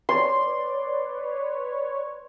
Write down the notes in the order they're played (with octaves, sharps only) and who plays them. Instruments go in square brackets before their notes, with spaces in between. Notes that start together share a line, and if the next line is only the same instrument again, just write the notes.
[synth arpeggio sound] B4 C#5 D5 [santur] C6